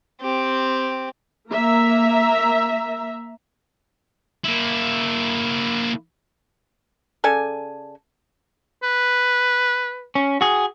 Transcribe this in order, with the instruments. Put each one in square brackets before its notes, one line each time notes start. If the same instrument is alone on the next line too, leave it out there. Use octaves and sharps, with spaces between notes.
[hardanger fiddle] C4 G4
[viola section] A#3 E5 A#5
[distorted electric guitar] A#3 E4
[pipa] C#3 A4 D5 G#5
[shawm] B4
[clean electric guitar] C#4
F#4 G#4